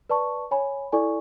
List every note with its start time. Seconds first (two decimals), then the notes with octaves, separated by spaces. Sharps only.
0.10 B4 D5 A5 C#6
0.51 C#5 G#5 B5
0.92 E4 A4 D5 G#5 C#6